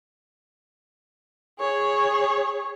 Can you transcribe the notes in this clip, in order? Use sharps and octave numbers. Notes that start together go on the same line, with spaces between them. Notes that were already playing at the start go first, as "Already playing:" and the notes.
G#4 C#5